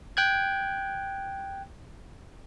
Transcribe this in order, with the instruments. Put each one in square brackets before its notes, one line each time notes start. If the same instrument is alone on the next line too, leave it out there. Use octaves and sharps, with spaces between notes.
[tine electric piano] G5 F#6 G#6